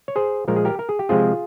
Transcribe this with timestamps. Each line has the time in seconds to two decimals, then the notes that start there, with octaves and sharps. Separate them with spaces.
0.08 C#5
0.16 G#4 C5
0.48 A#2 F3 G#3 A#4
0.56 G#4
0.65 G4 A#4
0.79 A#4
0.89 G#4
0.99 G4
1.09 C3 F3 G#3 C4 F4 G#4